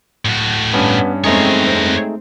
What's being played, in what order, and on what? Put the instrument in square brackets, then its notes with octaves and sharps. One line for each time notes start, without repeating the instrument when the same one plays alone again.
[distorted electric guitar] A2 F#4
[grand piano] G2 C#4 [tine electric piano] B3
[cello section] G#3 C4 [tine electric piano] A3 D#4 G#4 [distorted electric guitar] A#4 C#5